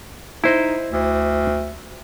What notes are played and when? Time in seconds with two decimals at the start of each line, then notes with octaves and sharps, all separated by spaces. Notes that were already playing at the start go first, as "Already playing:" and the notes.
0.44 D#4 E4 C5 D#5
0.92 D2